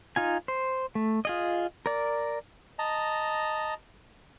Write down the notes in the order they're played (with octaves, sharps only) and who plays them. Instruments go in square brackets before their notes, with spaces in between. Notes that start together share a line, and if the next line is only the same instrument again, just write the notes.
[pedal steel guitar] D#4 F4 G#5
C5
A3
F4 G#4 D#5
A#4 D5
[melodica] D#5 A5 A#5